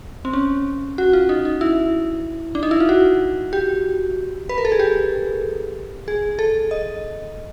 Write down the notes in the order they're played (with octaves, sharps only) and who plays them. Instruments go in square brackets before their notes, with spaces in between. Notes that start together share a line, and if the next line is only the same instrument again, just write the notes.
[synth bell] C4
C#4
F#4
F4
D#4
D#4
E4
D4
D#4
E4
F4
F#4
G4
B4
A#4
A4
G#4
G4
G#4
A4
D#5